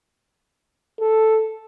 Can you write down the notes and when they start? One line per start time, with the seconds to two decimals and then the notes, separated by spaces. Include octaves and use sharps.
1.00 A4